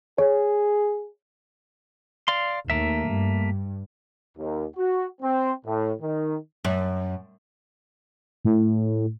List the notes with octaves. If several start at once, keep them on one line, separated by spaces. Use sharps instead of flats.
G#4 C#5
D5 F5 C6
D#2 A3 A#3 E5
G2
D#2
F#4
C4
A2
D#3
F#2
A2